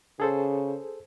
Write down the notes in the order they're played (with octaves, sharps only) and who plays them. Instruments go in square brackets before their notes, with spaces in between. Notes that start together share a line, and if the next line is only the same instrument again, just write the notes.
[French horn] C#3 [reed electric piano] G#4 A4 C5